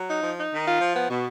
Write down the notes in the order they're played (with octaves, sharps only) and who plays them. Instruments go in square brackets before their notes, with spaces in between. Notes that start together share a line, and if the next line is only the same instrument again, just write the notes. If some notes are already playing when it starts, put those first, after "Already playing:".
Already playing: [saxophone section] F#3
D#4
F3
D#4
D#3
F4
F3
B3
B2